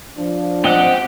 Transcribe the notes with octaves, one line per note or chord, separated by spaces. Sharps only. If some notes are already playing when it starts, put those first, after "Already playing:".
F3 D4
C4 G4 D#5 F#5